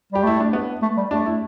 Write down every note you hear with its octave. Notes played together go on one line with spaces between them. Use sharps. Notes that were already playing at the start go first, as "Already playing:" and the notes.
G3 G4
A3 E4
D4
B3
A3
G3
A3 D4
E4